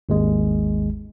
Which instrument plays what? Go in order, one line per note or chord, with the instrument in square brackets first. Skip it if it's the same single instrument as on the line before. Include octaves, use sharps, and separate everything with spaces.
[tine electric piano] G#1 D#2 G#3